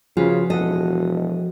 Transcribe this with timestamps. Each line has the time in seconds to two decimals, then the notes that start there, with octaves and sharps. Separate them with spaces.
0.17 C#3 F3 F4 F#4 G#4 B4
0.50 E1 A4 D#5 F#5